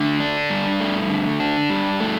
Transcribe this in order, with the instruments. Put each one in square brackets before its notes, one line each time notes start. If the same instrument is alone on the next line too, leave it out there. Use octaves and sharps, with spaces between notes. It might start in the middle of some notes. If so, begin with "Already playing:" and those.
Already playing: [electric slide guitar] D3 A3
D4
G2
A3
D3
D4
G2
A3